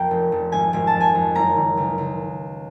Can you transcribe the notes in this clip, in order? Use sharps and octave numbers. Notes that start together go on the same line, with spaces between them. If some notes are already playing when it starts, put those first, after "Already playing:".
Already playing: F2 A#3 G5
F1
F1
G#1 G#5
G#1 G#5
A5
F2
G#5
F2
F#1 A#5
D#3
C#2
C#2